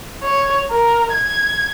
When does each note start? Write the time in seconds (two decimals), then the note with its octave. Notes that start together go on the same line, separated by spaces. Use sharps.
0.23 C#5
0.71 A#4
1.12 G#6